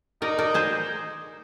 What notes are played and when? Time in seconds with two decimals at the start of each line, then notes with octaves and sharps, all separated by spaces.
0.22 D#4 A#4 D5
0.39 A#4 D5
0.54 G#4 C5